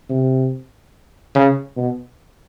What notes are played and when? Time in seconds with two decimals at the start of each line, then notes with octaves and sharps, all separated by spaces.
0.09 C3
1.35 C#3
1.76 B2